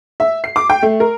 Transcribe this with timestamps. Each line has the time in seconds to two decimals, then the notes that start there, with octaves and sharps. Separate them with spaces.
0.20 E5
0.44 C7
0.56 D6
0.70 G5
0.82 A3
1.00 A#4